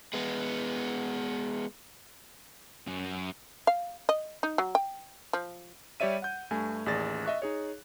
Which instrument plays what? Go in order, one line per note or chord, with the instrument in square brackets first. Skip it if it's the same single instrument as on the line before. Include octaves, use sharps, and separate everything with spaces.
[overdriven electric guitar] G#3 B3
[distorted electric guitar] F#2
[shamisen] F5
D#5
D#4
F#3
G5
F3
[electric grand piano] G3 G4 C#5 D5 E5 D#7
F#5 G6
G2 A3 G#5
A1 D#2 G#4 D5 A6 A#6
D#5 E5 C#6 F#6
D#4 G#4 C#5